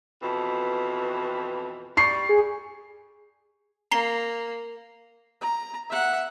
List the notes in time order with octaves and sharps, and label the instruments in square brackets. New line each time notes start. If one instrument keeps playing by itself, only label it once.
[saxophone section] F2 B2 E3
[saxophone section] G3 [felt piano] C#6 C7
[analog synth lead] G#4
[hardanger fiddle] A#3 [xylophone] A#5 C7 G7
[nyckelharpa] A#5
E5 F#5